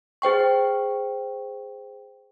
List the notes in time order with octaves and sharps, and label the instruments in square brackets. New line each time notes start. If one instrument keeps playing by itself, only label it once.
[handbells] G#4 C5 G5 C#6